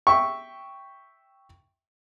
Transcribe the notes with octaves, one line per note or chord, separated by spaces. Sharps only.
E5 G5 C#6